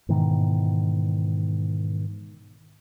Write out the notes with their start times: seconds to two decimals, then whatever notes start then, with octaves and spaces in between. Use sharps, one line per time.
0.09 G#2 B2 D#3 E3